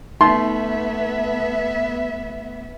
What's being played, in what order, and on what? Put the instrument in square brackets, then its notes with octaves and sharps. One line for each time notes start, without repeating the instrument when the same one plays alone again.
[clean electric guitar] A3 [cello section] B3 E5 [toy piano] D#4 [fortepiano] C6